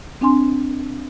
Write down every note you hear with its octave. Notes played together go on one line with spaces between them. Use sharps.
C4 D4 G#5 C6